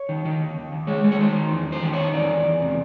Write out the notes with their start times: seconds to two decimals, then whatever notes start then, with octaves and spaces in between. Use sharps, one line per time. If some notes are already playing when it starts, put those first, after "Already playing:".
Already playing: C#5
0.09 D#3
0.25 D#3
0.40 D#2
0.57 D#2
0.72 D#2
0.87 G#3 C#5
1.04 G#3
1.12 C#5
1.19 D#3 C5
1.35 D#3
1.51 E2
1.67 E2
1.72 C5
1.83 D#3
1.93 D#3 C#5
2.13 E2 D5
2.30 E2
2.46 E2
2.62 C3